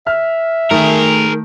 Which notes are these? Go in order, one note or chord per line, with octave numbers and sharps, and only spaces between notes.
E5 F6
D#3 A3 G#4 A#4